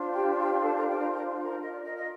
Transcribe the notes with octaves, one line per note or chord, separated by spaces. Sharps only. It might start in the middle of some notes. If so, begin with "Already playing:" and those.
Already playing: D4 F4 C5
G4 G5
G4 G5
A4 A5
A#4 A#5
G4 G5
A#4 A#5
A#4 A#5
A#4 A#5
F4 A#4 D#5
D5
D#5
D#5